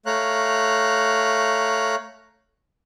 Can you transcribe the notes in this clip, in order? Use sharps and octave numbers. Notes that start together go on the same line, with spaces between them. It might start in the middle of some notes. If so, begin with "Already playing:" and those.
A3 C#5 F5 A#5 F#6